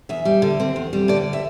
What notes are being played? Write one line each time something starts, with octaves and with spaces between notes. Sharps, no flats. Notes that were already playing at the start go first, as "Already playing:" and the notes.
E2 E5
G3
D3
C4
E2
G3
D3 D5
E5